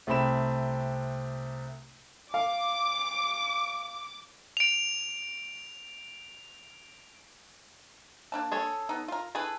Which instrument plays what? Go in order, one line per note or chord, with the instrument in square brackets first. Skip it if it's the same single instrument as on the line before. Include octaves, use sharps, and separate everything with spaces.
[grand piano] C2 A3 C4 B5 E7
[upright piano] F5 [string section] D6
[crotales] D7 F7
[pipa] A#3 D4 A5
[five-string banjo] G#4 A4 C#5
[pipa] B3 D#4
F4 A#4
[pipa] E3 B4 [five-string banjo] G#4 A4